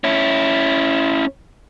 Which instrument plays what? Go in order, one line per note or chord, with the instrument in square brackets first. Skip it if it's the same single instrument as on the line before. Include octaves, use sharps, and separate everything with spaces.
[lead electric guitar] C#4 E4